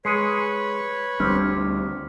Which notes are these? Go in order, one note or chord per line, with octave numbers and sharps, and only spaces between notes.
G#3 B4 C#5 C7 C#7 D#7
D2 G3 C4 D4 D6 F6